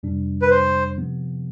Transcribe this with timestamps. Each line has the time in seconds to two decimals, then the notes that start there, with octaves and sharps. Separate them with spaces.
0.03 F2 C3 G3 D4
0.42 B4
0.51 C5
0.97 C3 F3 B3